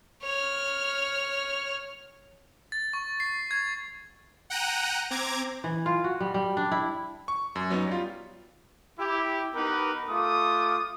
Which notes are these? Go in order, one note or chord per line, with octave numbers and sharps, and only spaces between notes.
C#5 F6
A6
C#6
C7
G#6
F#5 G5 A#5 F#6 D#7
C4 A#5 D6 G#6
E3
F4
F#4
G3
G3
D4
E4
C#6
F#2
F#3 B3 C#4 D#4
G3 F4
E4 G4
B3 D#4 G4 A#4 B4
A3 F4 D6 D#6